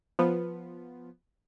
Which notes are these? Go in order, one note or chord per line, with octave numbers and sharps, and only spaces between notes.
F3 B3 F4